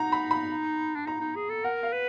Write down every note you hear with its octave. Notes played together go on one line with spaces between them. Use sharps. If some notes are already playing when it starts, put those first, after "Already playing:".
Already playing: D#4 F#5 A#5
B5
B5
D4
D#4 A#5
D#4
G#4
A4
A#4 F#5
F5
B4